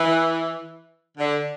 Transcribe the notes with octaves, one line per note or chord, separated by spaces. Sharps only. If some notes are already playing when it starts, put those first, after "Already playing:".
Already playing: E3
D3